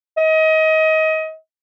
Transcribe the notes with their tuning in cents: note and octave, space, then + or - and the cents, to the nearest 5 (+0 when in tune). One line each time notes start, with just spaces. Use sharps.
D#5 +25